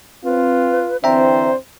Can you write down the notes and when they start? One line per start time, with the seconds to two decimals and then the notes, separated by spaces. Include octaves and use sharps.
0.25 C4 F4 B4
1.04 D3 E3 C4 C5 D5 E5 G5 A#5